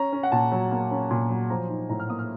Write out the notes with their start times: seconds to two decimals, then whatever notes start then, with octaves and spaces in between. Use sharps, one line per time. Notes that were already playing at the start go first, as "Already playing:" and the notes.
Already playing: C#4 A#5
0.13 C#4
0.23 F#5
0.32 A#2 A5
0.52 F#3
0.71 A#3
0.91 C#4
1.11 A#2
1.30 F#3
1.50 F3 A#5
1.69 D#4
1.89 A2 A#5
2.00 F6
2.09 A#3 D#6
2.19 F6